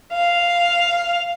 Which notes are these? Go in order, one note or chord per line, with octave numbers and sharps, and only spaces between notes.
F5